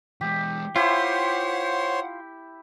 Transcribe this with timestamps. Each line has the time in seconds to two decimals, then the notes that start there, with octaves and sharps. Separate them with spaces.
0.21 E3 G#3 G4
0.76 E4 F4 G4 C5 C#5 F#5 C6